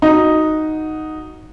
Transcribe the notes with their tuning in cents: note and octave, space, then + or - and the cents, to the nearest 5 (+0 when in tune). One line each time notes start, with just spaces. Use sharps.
D#4 +0 F#4 -5